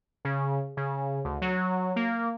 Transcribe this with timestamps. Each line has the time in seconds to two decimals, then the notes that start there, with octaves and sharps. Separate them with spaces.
0.25 C#3
0.77 C#3
1.25 D2
1.42 F#3
1.96 A#3